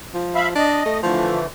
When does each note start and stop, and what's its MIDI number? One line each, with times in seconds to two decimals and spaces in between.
0.14 0.51 53
0.35 0.49 76
0.35 0.49 77
0.35 0.49 83
0.55 0.83 62
0.55 0.98 75
0.86 0.99 57
1.03 1.46 50
1.03 1.46 52
1.03 1.40 53
1.03 1.46 57